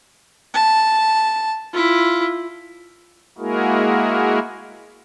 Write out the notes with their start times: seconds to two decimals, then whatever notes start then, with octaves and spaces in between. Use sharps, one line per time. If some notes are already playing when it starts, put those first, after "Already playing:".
0.54 A5
1.73 E4 F4
3.38 G#3 A#3 E4 F#4 G#4 A#4